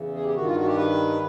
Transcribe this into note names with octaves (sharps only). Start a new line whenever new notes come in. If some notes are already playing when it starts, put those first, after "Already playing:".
Already playing: E2 C#3 E3
G#4
G4
G2 D#3 F#4
F4
F#4
G4
B4